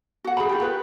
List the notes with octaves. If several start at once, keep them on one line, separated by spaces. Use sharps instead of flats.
F#4 F#5
G#4 B5
F4 G4
B4